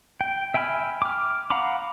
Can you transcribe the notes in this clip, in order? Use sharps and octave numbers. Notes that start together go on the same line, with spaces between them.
G5
E5 G5 G#5 B5 F6
D6 F6
F5 F#5 A#5 B5 D6